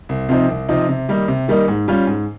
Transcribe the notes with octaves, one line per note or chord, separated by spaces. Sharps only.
C2
C3 F3 C4 D#4
C2
C3 F3 C4 D#4
C3
D#3 G3 A#3 D#4
C3
D#3 G3 A#3 D#4
G#2
G3 C#4 F4
G#2